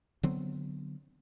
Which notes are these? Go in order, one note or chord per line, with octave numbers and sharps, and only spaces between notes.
D3 F#3 B3 C4